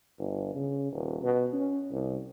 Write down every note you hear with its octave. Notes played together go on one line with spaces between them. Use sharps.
G1
C#3
D#1
B2
C#4
C2